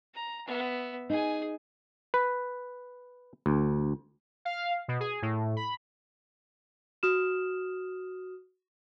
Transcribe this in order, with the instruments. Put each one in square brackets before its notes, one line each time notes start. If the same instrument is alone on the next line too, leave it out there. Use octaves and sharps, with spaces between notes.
[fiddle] A#5
B3 E5
[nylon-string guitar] D#4 [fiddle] G#4 G#5
[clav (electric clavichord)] B4
D2
[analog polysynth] F5
B2
G#4
A2
B5
[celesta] F#4 D#6 F6 E7